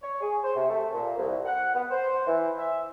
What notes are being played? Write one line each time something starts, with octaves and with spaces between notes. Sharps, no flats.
C#5
G#4
C5
C3
A3
A#2
C2
F#5
B3
C5
E3
E5